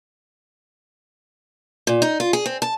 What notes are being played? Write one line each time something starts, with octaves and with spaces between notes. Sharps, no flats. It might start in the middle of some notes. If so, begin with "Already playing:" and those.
A#2
D#4
F4
G#4
C4
A5